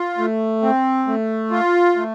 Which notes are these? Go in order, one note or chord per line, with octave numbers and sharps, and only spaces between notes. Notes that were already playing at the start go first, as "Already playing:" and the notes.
Already playing: F4
A3
C4
A3
F4
A3